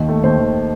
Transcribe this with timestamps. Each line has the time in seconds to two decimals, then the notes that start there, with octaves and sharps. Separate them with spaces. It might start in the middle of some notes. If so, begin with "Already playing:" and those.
Already playing: D#2 D#3
0.09 A3
0.23 D#2 C5
0.39 D#3